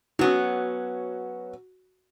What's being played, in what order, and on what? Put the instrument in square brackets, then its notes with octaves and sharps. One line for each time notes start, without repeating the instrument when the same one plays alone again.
[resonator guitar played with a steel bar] F#3 B3 C#4 [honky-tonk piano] F#4